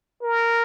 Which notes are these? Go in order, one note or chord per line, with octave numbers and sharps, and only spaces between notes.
A#4